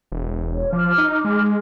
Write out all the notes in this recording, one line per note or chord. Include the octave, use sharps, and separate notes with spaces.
E1
C#5
F3 D6 F6
D#4
G#3